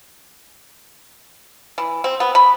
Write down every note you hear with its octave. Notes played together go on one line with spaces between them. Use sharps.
E3
C4
B3
B5